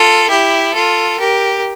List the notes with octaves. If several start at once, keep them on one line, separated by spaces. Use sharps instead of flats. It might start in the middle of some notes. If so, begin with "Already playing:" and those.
Already playing: F4 A4
E4 G4
F4 A4
G4 A#4